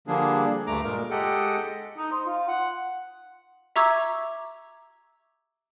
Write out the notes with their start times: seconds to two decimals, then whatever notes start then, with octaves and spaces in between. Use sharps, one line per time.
0.07 D3 F3 G3 A#3 D4 G#4
0.67 D2 G2 A3 A#5 D6
0.84 A#2 G#3 A#4
1.11 G#3 G4 A4 D#5 F#5 G5
1.97 D#4
2.12 C5
2.27 F4
2.48 F#5
3.76 E5 A#5 C#6 D6 E6 G#6